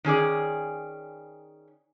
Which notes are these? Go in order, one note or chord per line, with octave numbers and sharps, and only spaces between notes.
D#3 C#4 G#4 D5